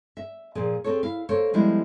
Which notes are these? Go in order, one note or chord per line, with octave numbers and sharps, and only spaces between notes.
E5
A#2 F3 G#4
C4 G#4 A4 C#5
E4 F5
A#3 A4 C5 C#5
F3 G3 G#3 B3 E4